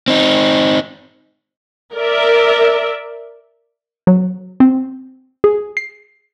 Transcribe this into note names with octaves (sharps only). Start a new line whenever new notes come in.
C4 D#4
A#4 D5 E5
F#3
C4
G#4
C7